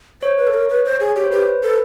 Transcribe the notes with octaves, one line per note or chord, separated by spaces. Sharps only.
C5 C#5
B4
A4
A#4
B4
C5
G#4
G4 C#5
C5
G4 B4
C5
A4 B4